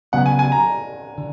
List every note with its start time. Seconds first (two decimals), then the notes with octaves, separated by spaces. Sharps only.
0.13 C#3 F#3 B3 F#5
0.26 G#5
0.39 G#5
0.52 A#5
1.18 D3